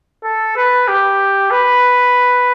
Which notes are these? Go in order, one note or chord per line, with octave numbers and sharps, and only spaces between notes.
A4
B4
G4
B4